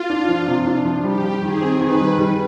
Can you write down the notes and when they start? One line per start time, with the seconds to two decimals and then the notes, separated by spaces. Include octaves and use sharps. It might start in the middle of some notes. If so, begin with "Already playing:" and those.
Already playing: F4
0.10 D4
0.29 F3
0.47 C3
0.66 D4
0.85 F3
1.04 G3 G4
1.24 G3
1.42 D#3 G#4
1.61 C4
1.81 D#3 B4
2.00 G3
2.19 G3